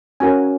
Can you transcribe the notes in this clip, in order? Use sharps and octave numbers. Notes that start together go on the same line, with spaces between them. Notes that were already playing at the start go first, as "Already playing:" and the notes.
C#4 F#4 A#4 C#5 G#5